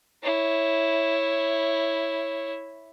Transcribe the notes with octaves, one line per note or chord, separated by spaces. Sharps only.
E4 C#5